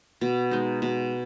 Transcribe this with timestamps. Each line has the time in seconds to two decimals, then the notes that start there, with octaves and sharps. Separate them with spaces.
0.21 B2
0.51 G#3 D#4
0.82 B2